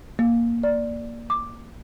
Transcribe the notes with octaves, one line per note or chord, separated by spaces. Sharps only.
A#3
D5
D6